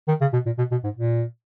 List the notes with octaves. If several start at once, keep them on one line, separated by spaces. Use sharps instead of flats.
D#3
C#3
B2
A#2
B2
B2
G#2
A#2